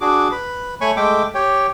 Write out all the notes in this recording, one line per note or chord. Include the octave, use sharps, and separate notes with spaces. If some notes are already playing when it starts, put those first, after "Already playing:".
D4 F#4 G#4 D6
B4 B5
A3 C#5 G#5 B5 C#6
G#3 A3 E5 G5 D6
G4 C#5 G5